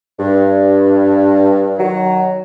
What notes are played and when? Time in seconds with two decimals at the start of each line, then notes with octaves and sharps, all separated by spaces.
0.19 G2
1.78 D#3 F#3